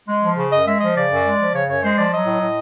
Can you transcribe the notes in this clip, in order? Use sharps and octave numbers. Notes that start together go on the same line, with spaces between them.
G#3
F3
C#3
F#2 D#5
G#3 E5
F3 D#5
C#3 D5
F#2
G#3
F3
C#3 C#5
F#2 C#5
G#3 C5
F3 D5
F#3 D#5
A2
A2